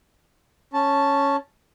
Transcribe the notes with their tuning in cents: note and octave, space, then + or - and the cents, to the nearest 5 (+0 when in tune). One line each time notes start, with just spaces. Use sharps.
C#4 +0 A5 -5